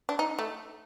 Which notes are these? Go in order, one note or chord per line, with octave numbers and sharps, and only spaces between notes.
D4
D#4
A3